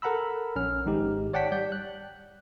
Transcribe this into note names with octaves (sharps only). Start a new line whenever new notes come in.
A4 A#4 F#5 A#5 B5 E6
A#1 C#4 F6
G#1 G#2 D#4 G4
C#5 D5 F#5 G5 A5 B6
G3 D5 G6
F#6